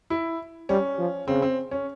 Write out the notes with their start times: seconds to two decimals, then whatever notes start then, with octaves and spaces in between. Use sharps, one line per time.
0.10 E4
0.69 G3 C#4
0.99 F3
1.27 C#3 C4
1.42 C4
1.71 C#4